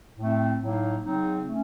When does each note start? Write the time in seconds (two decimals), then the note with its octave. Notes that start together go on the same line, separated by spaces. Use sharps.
0.18 A2 A3 C4
0.61 A2 F#3 A#3 D#4
1.04 C#3 F#3 C4 D#4
1.47 A3 C#4